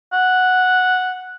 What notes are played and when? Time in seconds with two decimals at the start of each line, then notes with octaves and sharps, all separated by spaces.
0.13 F#5